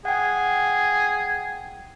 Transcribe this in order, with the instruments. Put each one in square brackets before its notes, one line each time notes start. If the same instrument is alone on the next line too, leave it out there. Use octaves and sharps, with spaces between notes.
[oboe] G#4 [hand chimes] F#5 G5